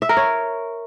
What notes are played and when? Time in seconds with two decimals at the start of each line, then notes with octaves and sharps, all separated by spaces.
0.02 E5
0.09 A#4
0.17 C#5